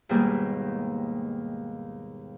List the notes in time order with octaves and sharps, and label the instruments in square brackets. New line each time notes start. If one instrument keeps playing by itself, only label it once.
[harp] D#2 G#2 B2 D#3 G3 A#3